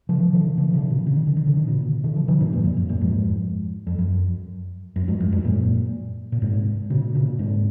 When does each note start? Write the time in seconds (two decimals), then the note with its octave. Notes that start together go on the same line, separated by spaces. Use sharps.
0.09 C#3 F3
0.23 F3
0.33 C3 D#3
0.58 C#3 F3
0.74 C3 D#3
0.90 A#2 C#3
1.07 C#3
1.17 D#3
1.27 C#3
1.37 D#3
1.47 C#3
1.57 D#3
1.67 A#2 C#3
2.04 C3 D#3
2.16 C#3 F3
2.28 D#3 F#3
2.41 G#2 C3
2.52 F#2 A#2
2.64 F2
2.77 F#2
2.89 F#2 A#2
3.01 F2 G#2
3.87 F2
3.99 F#2
4.96 F#2
5.08 F2 G#2
5.20 F#2
5.32 F2 G#2
5.44 F#2 A#2
6.32 A#2
6.42 G#2 C3
6.90 A#2 C#3
7.15 A#2 C#3
7.39 G#2 C3